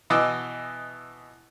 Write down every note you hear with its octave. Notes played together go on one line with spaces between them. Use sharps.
B2 E3 D#5 D6 E6